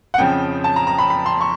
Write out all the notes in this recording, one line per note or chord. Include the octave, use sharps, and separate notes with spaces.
F#5
F2 C#3 F3 G5
A5
A#5
A#5
B5
B5
C6
C#6